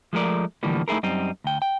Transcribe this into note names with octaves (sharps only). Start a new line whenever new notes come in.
F3 G#3 A3 A#4 D5
A2 D3 E3 F3 G3 A#3
A3 D#4 E4 G#4 A#4
F#2 G3 C4 D#4
D2 G5
G5